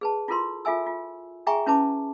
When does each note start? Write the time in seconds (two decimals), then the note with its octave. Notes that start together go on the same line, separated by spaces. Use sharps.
0.01 G#4 B4 A5
0.28 E4 F4 A4 A#4 C5 C6
0.65 F4 A4 E5 G#5 E6
0.87 F4
1.47 G#4 E5 G5 G#5 A#5 C#6
1.66 C#4 E4 B4 C5 A5 D6